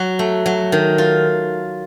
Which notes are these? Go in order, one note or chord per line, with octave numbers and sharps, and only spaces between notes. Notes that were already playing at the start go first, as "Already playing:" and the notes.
Already playing: F#3 F#4
A3
F#3
D#3
F4